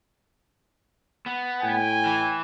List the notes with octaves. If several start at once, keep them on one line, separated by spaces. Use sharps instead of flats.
B3
A2 G5 G#5
E3